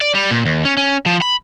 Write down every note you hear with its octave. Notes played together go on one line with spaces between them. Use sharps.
D5
G3
A#2
D#2
C#4
C#4
F3
B5